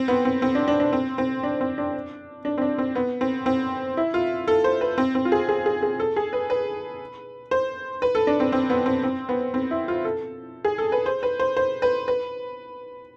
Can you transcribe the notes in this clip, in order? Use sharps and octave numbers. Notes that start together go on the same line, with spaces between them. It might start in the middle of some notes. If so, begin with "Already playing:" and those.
Already playing: C4
B3
C4
C4
D4
D4
D4
C4
C4
D4
C4
D4
D4
C4
D4
C4
B3
C4
C4
E4
F4
A4
C5
B4
C4
C4
F4
G#4
G#4
G#4
G#4
A4
G#4
B4
B4
C5
B4
A4
D4
C4
C4
B3
C4
C4
B3
C4
E4
F4
A4
G#4
A4
B4
C5
B4
C5
C5
B4
B4